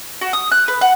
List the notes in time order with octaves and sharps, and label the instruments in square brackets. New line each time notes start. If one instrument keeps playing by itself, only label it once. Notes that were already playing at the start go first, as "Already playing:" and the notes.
[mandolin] F#4
D#6
F#6
B4
F#5